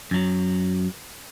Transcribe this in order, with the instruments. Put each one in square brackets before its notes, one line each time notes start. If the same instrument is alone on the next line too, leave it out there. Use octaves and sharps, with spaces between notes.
[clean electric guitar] F#2 F#3